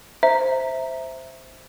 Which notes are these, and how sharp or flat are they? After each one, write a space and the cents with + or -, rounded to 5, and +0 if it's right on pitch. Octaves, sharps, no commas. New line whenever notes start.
C5 +0 E5 +0 A#5 -10